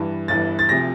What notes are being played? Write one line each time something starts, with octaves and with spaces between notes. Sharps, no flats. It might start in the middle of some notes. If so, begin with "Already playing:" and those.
Already playing: G2 E3
G1 G2 E3 A6
A6
D2 C3 F3 A#6